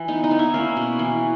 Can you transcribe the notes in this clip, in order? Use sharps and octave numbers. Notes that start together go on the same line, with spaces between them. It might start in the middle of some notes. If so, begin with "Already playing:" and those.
Already playing: E3
B3 D#4
D#4
B3
E4
A#3 C#4
B2
E3